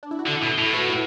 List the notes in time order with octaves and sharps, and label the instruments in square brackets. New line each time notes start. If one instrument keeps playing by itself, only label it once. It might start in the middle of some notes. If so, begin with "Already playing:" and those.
[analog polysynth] D4
E4
F#4
[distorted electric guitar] D3 [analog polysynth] E4 A4
[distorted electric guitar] B2
A2
[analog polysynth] A4
F#4 B4
E4